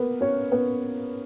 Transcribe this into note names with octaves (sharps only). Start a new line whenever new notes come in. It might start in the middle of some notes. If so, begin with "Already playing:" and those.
Already playing: A#3 B3 A#4 B4
C#4 C#5
B3 B4